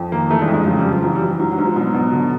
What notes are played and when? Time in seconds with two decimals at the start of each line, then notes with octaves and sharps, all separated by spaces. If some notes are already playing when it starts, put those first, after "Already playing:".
Already playing: F2
0.12 D#3 A#3
0.30 E3 A3
0.42 G#3
0.48 F2
0.54 G#3
0.66 C#3 F#3
0.79 G3
0.85 F#2
0.91 F3
1.03 E3 F#3
1.15 G3
1.22 E3
1.28 F#3
1.40 G#2 F#3
1.52 F#3
1.58 G#2
1.65 F3
1.76 B2 F#3
1.94 B2
2.13 D3